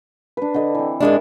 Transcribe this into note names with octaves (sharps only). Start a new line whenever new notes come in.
D4 B4
D3 D#5
E3 C4
G#2 G#3 D4 E4 A#4